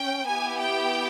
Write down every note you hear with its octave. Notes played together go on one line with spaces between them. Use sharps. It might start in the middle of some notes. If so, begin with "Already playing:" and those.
Already playing: C#4 G5
B3 E4 G4 G#5
G5